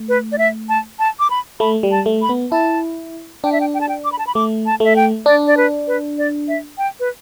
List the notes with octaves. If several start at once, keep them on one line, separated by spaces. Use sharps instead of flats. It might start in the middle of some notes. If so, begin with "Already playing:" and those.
Already playing: A3
B4
D5
E5
A5
A5
D6
B5
A3 B5
G3
A5
A3
B5
B3
E4 A5
D4 G5
E5
G5
G5
A5
G5
D6
B5
A5
B5
A3 D6
A5
A3 E5
G5
D4 D5
D5
B4
B4
D5
E5
G5
B4